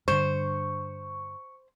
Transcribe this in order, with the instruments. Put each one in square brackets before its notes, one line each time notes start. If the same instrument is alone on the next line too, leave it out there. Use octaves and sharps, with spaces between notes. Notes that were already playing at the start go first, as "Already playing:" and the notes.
[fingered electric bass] G2 D3 [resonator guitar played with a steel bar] C5 [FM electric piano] C#6